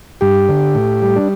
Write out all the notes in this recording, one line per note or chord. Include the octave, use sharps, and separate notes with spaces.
G2 G4
D3
A2
G3
D4